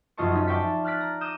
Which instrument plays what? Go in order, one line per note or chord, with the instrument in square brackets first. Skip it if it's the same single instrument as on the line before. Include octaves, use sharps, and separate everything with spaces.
[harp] F1 F#2 F4 D#5 A5 C#6
C#4 D#4
D5 E5 G5 A5 C#6 B6
F6 F#6 A6 B6 D7
A#5
D6 D#6 G6 A#6 D#7 E7